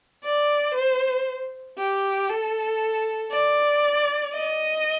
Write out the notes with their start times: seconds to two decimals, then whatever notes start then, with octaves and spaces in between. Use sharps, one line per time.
0.24 D5
0.74 C5
1.78 G4
2.29 A4
3.31 D5
4.34 D#5